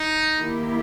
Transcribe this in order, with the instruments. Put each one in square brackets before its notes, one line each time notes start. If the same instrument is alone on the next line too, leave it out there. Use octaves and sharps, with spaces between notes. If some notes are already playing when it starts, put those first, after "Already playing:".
Already playing: [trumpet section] D#4
[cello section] D#3 A#3 E4 G4